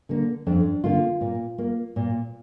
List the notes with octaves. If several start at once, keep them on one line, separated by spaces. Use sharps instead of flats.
D3 A#3
F2 D4
D3 A#3 F4
A#2
A#3
A#2